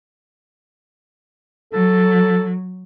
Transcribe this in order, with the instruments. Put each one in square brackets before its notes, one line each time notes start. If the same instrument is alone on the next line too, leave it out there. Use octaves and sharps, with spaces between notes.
[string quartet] F#3 [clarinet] A4